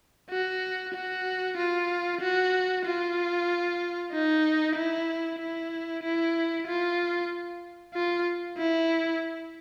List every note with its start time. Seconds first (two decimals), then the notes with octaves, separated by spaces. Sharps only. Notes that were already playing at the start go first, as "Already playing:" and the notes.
0.30 F#4
0.94 F#4
1.57 F4
2.21 F#4
2.85 F4
4.12 D#4
4.76 E4
5.40 E4
6.03 E4
6.67 F4
7.94 F4
8.58 E4